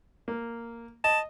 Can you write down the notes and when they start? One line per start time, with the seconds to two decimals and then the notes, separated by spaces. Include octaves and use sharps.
0.28 A#3
1.04 D#5 A5